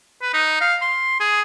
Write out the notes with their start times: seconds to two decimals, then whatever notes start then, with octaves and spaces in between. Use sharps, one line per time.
0.22 B4
0.33 D#4
0.61 F5
0.81 C6
1.20 G#4